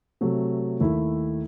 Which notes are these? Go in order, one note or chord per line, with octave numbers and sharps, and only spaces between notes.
C3 F#3 A3
D#2 D#3 A3 E4